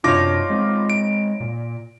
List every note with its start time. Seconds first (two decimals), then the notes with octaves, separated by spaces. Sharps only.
0.04 F#2 C3 D4 D#4 F4 C#5 D6 A#6
0.50 G#3 C4
0.90 D7
1.40 A#2